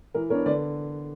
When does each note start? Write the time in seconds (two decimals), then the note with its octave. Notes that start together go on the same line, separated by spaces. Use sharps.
0.14 E3 A#4
0.30 B3 A#4 C#5
0.34 D4
0.46 D3 B4 D5